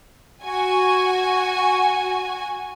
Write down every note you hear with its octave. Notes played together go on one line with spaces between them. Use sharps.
F#4 G#5